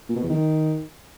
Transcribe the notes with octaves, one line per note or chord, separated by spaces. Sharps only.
A#2
B2
E2
D#3